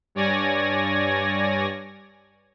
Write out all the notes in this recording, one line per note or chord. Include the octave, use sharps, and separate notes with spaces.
G2 C#5 D5 G#5 G#6 A#6